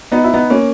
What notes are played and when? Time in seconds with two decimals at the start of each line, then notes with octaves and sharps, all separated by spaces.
0.12 B3 D#4
0.24 E4
0.34 B3 D#4
0.50 A#3 C#4